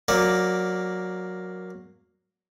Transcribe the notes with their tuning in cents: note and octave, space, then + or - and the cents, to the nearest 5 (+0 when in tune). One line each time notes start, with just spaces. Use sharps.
F#3 -15 A#3 +0 D5 +0